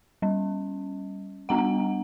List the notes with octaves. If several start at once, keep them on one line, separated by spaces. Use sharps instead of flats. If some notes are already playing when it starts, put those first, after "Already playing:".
G3 C#4
G3 B3 D4 F#5 A#5